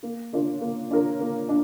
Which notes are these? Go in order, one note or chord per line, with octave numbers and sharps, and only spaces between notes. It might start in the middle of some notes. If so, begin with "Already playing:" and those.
A#3
D4 F4 A#4 C#5
A#3
D4 F4 A#4 C#5
A#3
D4